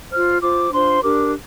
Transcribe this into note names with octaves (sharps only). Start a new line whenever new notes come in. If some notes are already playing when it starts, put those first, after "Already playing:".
F4 C5 F6
F4 C5 D6
D4 F4 C5 C6
D4 G4 A#4 D6